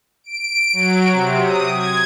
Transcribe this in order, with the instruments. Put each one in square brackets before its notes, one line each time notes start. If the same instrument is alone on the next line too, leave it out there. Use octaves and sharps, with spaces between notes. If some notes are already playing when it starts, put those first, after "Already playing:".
[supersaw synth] D7
F#3
C3
D#6
G#6